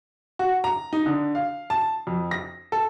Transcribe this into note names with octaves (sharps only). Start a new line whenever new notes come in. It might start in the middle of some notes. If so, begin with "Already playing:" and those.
F#4
A#5
D#4
D3
F5
A5
F2
A#6
A4